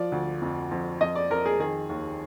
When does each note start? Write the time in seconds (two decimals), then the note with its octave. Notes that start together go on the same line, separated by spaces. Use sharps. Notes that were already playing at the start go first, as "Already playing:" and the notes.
Already playing: F3 D5
0.12 D2
0.42 F2
0.71 F2
1.01 F2 D#5
1.16 D5
1.30 F2 A#4
1.46 G#4
1.59 D#3 G#4
1.90 D#2